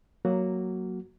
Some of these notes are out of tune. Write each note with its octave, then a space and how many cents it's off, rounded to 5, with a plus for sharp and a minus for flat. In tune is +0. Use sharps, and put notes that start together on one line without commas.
F#3 +0 A#3 +0 F#4 +0